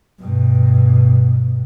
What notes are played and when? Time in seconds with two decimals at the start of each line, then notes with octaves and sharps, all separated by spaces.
0.20 G2 B2